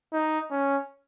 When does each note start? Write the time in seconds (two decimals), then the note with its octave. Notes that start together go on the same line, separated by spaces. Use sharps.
0.13 D#4
0.51 C#4